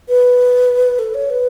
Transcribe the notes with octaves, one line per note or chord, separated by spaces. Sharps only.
B4
A4
C#5
B4